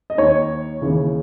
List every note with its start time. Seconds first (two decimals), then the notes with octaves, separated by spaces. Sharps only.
0.10 D#5
0.18 D#2 D#3 C#5
0.81 D#2 C#3 E3